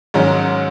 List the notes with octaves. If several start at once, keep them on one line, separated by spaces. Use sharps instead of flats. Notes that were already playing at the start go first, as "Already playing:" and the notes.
G#2 D#3 F#3 C#4